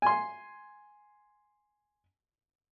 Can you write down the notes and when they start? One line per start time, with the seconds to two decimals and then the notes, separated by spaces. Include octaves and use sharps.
0.02 G#5 C6